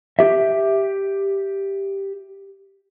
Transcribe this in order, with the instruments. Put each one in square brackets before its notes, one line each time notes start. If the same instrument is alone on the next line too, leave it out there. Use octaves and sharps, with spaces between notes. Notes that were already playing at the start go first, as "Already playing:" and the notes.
[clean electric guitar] G4 E5